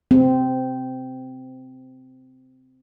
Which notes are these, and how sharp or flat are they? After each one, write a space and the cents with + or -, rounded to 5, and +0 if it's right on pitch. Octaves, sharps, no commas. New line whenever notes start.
C4 -15